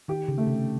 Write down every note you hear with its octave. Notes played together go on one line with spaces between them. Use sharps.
D#3 G4
C#3
A3
C3